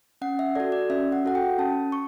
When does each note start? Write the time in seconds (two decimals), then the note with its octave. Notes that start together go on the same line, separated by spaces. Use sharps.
0.21 C#4 F#5
0.39 E5
0.55 F#4 A4 D5
0.72 D5
0.90 C#4 E5
1.12 F#5
1.25 F#4 A4 F#5
1.35 G5
1.58 C#4 A5
1.92 C#6